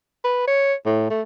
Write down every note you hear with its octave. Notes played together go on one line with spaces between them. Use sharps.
B4
C#5
A2
A3